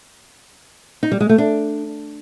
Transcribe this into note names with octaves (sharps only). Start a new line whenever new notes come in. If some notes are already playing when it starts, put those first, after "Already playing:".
D#4
G3
G#3
A3
D4